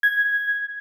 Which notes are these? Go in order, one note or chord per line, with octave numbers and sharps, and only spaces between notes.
G#6